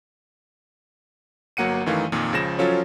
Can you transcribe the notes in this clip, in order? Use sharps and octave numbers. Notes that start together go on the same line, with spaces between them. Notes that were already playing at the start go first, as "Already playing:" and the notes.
G1 F#3 A#3 F#5 C#7 D#7
F#2 D#3 E3 A3 F5
F2 A#2 D#3
C#2 C#3 F3 A#6 E7
F3 F#3 C#4 F4 A4 C#5